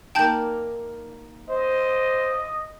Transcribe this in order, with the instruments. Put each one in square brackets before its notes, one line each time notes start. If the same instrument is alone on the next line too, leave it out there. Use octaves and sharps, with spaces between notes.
[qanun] A#3 D#4 D5 [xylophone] G5 A5 G6
[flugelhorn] C5 [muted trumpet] D#5